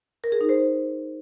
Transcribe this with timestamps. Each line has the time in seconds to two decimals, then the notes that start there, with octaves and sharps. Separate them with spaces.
0.24 A#4
0.32 G#4
0.41 D#4
0.49 C5